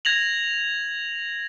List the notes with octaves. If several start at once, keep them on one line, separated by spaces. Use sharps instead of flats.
G#6 A#6 F7 F#7